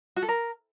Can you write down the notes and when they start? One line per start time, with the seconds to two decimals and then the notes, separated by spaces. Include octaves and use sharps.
0.16 F#4
0.23 A4
0.29 A#4